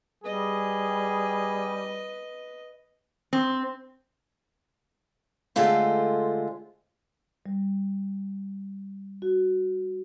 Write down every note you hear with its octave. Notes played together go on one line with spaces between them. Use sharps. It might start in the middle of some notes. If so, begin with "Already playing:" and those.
G3 G#4 B4 D#5
C4
D3 G#3 A3 F4 C5
G3
F#4